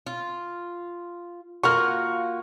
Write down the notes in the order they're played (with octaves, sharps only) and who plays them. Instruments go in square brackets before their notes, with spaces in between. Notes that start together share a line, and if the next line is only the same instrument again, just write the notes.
[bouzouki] F4
[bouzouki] A#3 F4 F#4 [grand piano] C#6 F6